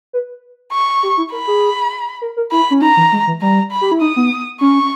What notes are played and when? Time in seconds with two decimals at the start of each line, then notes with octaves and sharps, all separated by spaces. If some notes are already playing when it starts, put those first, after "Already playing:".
0.13 B4
0.72 C#6
1.03 G4
1.17 E4
1.32 A#4 B5
1.47 G#4
2.22 A#4
2.37 A#4
2.52 E4 B5
2.71 C#4
2.82 D#4 A#5
2.97 E3
3.12 G#3
3.27 E3
3.42 G3 A#5
3.71 B5
3.81 G4
3.92 E4
4.01 D#4 D#6
4.16 B3
4.61 C#4 C#6